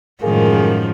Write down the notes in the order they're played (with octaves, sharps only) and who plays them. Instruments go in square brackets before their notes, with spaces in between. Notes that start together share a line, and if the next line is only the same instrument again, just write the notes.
[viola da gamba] F#2 D#3 F3 [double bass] A2 G#3 [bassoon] A#3 [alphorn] G#4